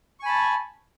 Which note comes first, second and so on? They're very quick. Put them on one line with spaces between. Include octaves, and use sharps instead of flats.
C#6 G#5 B5 A5